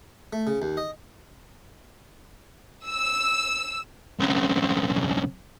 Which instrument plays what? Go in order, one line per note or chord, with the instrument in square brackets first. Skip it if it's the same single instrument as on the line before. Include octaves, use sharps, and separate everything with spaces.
[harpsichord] A3
C#3
D#2
D#5
[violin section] E6
[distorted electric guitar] B1 C#3